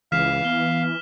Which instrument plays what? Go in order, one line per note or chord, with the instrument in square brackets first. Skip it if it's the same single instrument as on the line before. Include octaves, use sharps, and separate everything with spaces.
[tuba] C#2 [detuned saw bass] E3 [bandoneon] F5 [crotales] F6 B6 E7
[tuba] B3 [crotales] G7